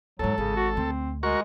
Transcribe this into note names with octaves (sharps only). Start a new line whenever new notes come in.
F2 G#2 F#3 A4
G#1 C#3
F#4
D2 C4
G#3 F#4 A#4 C#6